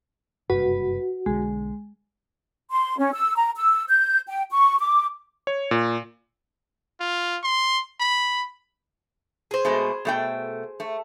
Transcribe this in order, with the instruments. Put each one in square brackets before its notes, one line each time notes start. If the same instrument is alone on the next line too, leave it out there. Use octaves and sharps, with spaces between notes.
[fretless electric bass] F#1 G2 C3 [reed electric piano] F#4 [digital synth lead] B4
[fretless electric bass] B1 D3 [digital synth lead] G#3
[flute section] C6
C#4
E6
A#5
E6
G6
G5
C#6
D6
[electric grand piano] C#5
A#2
[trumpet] F4
C6
B5
[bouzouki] G#4 C5
[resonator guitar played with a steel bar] B2 G#3 A3
B2 A3 G5
A3